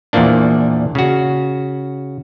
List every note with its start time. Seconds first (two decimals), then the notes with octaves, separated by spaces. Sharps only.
0.13 E2 A#2 E3 F3 A#3 D4
0.95 C#3 F#4